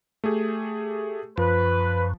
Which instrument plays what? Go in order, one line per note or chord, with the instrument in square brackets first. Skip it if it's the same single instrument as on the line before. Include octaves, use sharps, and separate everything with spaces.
[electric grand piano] A3 G4 G#4
[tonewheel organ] F#2 [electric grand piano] F3 [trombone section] B4